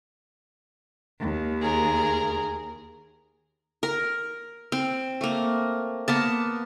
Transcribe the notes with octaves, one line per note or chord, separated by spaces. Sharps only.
D#2
G#4 A#4
A#4
C4
A3 A#3
A#3 B3 A5